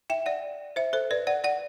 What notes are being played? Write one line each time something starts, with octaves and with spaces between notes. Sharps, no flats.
E5 G5
D5 F#5
C5 E5
A4 C5
B4 D5
D5 F#5
D5 F#5